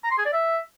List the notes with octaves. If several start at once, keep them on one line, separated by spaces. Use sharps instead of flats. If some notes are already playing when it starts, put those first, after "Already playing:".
A#5
C6
G#4
D5
E5